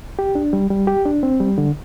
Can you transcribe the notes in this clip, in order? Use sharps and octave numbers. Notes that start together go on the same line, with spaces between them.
G4
D4
G3
G3
G4
D4
C4
G3
D3